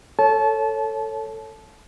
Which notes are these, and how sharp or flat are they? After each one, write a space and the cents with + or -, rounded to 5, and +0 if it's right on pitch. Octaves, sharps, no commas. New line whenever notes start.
A4 +15 C#5 +0 A5 -25